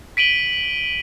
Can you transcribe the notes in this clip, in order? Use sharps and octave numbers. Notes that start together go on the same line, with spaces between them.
B6 D7 D#7 F#7 G7